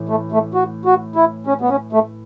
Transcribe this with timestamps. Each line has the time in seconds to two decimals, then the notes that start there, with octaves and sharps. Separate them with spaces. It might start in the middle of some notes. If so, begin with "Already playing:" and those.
Already playing: A2 E3
0.09 A3
0.32 A3
0.54 F#4
0.85 F#4
1.16 E4
1.47 C#4
1.61 B3
1.69 C#4
1.92 A3